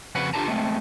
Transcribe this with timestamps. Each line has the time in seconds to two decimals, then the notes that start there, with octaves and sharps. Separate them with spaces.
0.15 F2 C#3 C#4 F#4 B4 F#5
0.34 D4 F4 G4 A4 A5 A#5
0.48 G#3 A3 C4